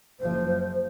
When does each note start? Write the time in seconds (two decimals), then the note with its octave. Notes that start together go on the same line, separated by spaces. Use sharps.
0.20 F#1 F3 C5